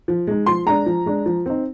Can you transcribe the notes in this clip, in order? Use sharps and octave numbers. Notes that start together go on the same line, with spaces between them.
F3
G#3 D#4
F3 C6
G#3 D4 A#5
F3
G#3 D4
F3
C4 D#4